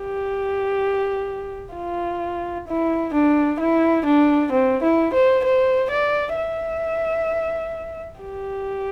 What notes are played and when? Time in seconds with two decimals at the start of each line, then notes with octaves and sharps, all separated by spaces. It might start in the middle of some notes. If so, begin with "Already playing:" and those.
Already playing: G4
1.75 F4
2.68 E4
3.14 D4
3.60 E4
4.06 D4
4.52 C4
4.83 E4
5.14 C5
5.44 C5
5.90 D5
6.36 E5
8.21 G4